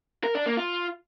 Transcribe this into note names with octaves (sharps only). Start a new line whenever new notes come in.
A#4
D4
A#3
F4